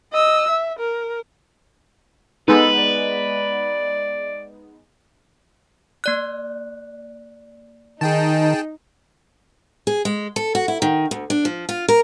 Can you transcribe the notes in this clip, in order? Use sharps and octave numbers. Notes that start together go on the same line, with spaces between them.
D#5 E6
E5
A#4
G#3 B3 D#4 A4 B4
D5
A#3 D5 F#6
D#3 D#4 G#4 G5 A5
G#4
G#3
A4
F#4
E4
D#3
D2
D4
F3
F4
A#4